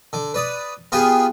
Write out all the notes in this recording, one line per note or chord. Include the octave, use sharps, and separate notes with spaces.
D3 D6
B4 D5 D#6
B3 F4 G4 G#4 G5 G#5